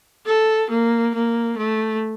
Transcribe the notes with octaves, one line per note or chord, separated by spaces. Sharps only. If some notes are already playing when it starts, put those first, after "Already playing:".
A4
A#3
A#3
A3